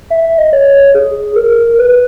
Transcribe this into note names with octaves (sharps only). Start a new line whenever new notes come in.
E5
E5
D#5
C#5
G#4
A#4
B4